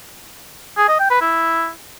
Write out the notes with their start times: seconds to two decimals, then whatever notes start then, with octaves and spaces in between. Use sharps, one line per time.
0.77 G#4
0.88 D#5
0.99 G5
1.10 B4
1.21 E4